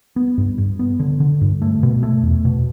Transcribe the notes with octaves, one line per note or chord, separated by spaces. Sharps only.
B3
G2
G2
B3
D3
D3
G2
A3
B2
A3
E2
B2